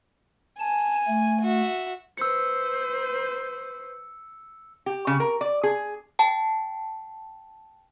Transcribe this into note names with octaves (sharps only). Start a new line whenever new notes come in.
G#5 A5
A3
F#4 E5
B4 C5 E6 C#7
G4
C#3
A#4
D5
G#4
G5 A5